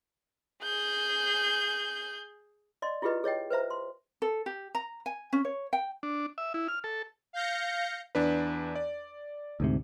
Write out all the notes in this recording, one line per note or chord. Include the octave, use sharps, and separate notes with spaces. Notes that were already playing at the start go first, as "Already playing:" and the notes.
G#4 G6
D5 D#5 C6
E4 F4 G4 G#4 B4 D#5
G#4 C#5 D#5 G5
B4 C5 E5 A#5
C6
A4
G4
A#5
G#5
C#4
C#5
G5
D4
E5
E4
F6
A4
F5 G6 A#6 C#7
E2 D4 B4
D5
D2 G#2 C3